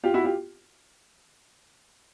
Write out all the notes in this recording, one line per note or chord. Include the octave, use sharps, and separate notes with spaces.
F4 G4
E4 F#4
F4 G4